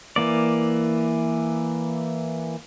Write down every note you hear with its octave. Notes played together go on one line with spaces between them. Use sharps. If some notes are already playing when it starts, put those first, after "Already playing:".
E3 A#3 D5